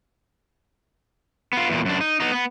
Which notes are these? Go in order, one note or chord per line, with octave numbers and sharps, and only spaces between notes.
B3 F4
E2 A#2
F#2 D4
D#4
B3 D#4
B3